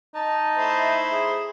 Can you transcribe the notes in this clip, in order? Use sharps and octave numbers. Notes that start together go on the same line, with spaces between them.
D#4 A5
A3 E4 C5
G#4